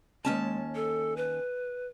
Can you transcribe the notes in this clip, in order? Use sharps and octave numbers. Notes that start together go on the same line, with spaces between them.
D#2 G#3 C#4 A5
A4
B4